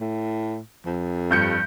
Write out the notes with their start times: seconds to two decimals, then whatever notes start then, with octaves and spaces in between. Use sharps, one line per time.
0.01 A2
0.86 F2
1.31 G2 G6 C#7